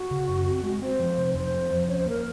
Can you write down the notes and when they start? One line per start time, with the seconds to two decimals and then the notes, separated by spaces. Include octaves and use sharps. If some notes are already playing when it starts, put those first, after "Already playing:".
Already playing: F#4
0.11 C#3
0.29 F#2
0.46 C4
0.63 G#3
0.82 C4 C5
0.99 F3
1.18 C3
1.35 F2 C5
1.53 C4
1.71 F3
1.88 C#4 C#5
1.99 C5
2.06 A#3 A#4